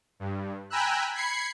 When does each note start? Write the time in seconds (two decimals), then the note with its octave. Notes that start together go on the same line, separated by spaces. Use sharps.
0.20 G2
0.70 G5 G#5 A#5 B5 E6 F#6
1.13 B5 G#6 C7 C#7